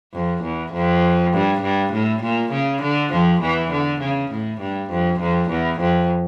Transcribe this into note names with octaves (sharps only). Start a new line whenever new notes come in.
F2
E2
F2
G2
G2
A2
A#2
C#3
D3
F2 F3
E2 E3
D3
C#3
A2
G2
F2
F2
E2
F2